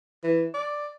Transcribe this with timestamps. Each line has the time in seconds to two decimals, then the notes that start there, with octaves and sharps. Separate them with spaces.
0.24 E3
0.54 D5